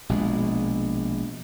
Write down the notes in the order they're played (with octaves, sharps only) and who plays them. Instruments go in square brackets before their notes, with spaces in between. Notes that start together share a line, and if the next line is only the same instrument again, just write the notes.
[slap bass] A#1 B2 G#3